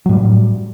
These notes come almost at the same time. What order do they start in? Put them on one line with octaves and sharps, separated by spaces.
F#3 A2 G3